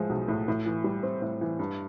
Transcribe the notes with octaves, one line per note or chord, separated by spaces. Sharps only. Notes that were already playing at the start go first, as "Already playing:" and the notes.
Already playing: A2 F3 G#3
B1
A2
A2
E3
G3
C4
A2
E3
G2